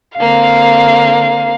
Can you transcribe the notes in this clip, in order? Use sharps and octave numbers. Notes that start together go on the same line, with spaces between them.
D3 A#3 C4 F5